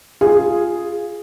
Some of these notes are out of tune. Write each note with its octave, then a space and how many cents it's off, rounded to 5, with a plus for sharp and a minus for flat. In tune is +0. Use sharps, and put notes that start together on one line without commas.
F4 +0 G#4 +0